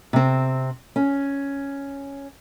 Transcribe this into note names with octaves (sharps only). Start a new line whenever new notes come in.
C3 C4
C#4